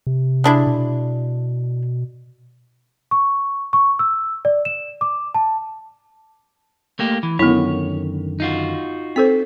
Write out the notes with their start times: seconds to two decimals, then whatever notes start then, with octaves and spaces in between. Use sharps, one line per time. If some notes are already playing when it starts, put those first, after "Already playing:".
0.07 C3
0.44 G#3 D4 E4
0.67 B2
3.11 C#6
3.73 C#6
3.99 E6
4.45 D5
4.65 E7
5.01 D6
5.35 A5
6.99 A3 A#3 G4
7.23 E3
7.39 F#2 D3 D#3 B3 E4 C#5
8.40 D#4 F4 F#4
9.16 C4 A4 C5 B6